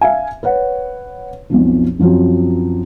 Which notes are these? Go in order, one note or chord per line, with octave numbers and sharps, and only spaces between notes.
E5 F5 G#5
B4 C#5 F#5
B1 F2 B2 F3
F#2 F3 F#3 C4